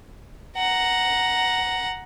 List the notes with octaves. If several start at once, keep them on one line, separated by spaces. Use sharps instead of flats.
F#5 A#5